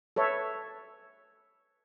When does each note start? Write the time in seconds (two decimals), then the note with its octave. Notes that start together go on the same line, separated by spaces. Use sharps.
0.16 A4 B4 C#5 E5